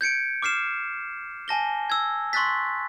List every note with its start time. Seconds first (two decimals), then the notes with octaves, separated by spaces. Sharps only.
0.01 G6 G#6 C#7 D7
0.42 D6 F6 C7 E7
1.48 G#5 A5 A#6 G7
1.90 E6 G#6
2.33 C6 C#6 E6 F#6 A6 B6